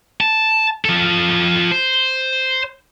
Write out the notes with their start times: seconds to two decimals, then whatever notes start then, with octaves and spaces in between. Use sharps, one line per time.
0.21 A5
0.85 F3 A4
1.71 C5